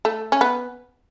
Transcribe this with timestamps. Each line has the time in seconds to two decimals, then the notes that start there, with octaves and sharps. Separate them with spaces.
0.05 A3
0.32 C#4
0.41 B3